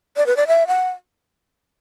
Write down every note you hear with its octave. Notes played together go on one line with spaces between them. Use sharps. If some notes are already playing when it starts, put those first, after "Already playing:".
D5
B4
D5
E5
F#5